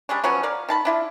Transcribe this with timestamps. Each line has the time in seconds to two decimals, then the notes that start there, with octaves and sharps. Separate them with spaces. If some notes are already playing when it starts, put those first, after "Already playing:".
0.09 G3 G#3 C#4 D4
0.24 F3 F#3 B3 C#4
0.43 A#4 D5 F5
0.69 D#3 A5 B5
0.85 D4 E4 F4